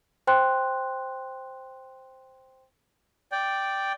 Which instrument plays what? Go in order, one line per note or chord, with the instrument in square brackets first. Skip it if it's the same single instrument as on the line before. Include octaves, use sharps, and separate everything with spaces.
[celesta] C5 G5 C6 F#6
[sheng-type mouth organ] D5 G5